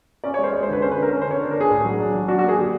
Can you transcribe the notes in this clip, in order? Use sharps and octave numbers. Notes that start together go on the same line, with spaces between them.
C#4 D5
C#5
G#3 C5
G#3
C5
D3 B4
C#4 C5
B4
D3 A#4
C#4
C5
D3
C#5
D4
A#4
D4 G#4
A2
F#3
D4
F#3
D4 F#4
F#4
A#3 G#4
D3 G4